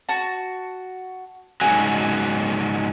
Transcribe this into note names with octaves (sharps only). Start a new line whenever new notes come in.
F#4 A5
G#2 C#3 F#3 G#5